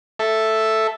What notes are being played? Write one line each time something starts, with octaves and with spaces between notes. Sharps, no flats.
A4 E5